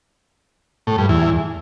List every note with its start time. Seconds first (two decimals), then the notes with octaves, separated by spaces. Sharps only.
0.87 A2
0.98 G2
1.09 E2